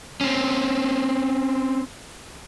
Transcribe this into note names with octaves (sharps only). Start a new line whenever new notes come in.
C4 C#4